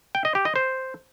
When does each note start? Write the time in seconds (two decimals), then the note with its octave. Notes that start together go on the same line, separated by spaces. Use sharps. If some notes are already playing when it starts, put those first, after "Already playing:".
0.15 G5
0.25 D#5
0.35 G4
0.45 D#5
0.56 C5